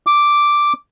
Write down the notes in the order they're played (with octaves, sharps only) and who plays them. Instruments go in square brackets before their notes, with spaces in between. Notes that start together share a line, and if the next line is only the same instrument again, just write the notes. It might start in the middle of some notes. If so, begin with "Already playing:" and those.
[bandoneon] D6